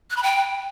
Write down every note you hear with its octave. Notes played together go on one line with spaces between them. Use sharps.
F#6
B5
G5